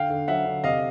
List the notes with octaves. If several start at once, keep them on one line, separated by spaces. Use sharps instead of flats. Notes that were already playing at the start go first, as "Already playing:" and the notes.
Already playing: D3 F5 G5
D3
F#3 E5 F#5
D3
C3 D#5 F5